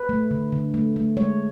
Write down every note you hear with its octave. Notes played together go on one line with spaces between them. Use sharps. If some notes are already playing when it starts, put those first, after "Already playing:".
Already playing: B4
A3
D3
D3
A3
A3
G#3 C#5